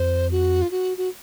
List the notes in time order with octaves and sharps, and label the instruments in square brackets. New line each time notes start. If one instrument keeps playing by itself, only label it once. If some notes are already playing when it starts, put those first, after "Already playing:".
Already playing: [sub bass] F2 [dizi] C5
[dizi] F#4
F4
F#4
F#4